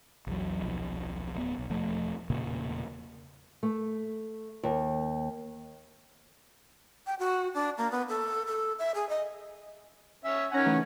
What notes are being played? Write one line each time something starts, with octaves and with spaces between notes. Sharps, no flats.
A#1 E2 F#3
D#1 B1 F3
D1 B3
B1
E1 F3 A3
E1 A#2 C#3 A#3
A3
D#2
G5
F#4
D4
A#3
B3
A4
A4
E5
G#4
D#5
C#4 C#5 E5
D#3 C#4 F#5 G#5 A#5 C#6
C#3 E3 A3